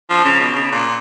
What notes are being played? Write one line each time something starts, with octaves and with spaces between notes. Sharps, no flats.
F3
C#3
B2
C#3
A#2